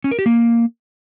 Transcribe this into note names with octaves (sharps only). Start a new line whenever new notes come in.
C#4
A#4
G4
A#3